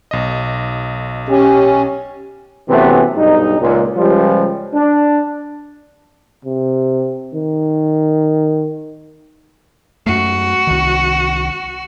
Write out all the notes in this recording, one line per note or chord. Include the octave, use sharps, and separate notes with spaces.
B1 D#5
C#4 G4
F#2 C3 E3 A3 B3
B1 G2 D#4
C#2 A#2
C#2 F3 G3
D4
C3
D#3
F#2 A3 F#4
C2 D#3